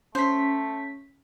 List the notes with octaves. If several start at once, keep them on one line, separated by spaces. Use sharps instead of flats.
A3 C#4 C5 B6